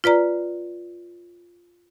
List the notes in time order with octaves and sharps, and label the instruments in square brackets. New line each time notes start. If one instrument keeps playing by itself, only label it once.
[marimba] F4 B4 D5 A#5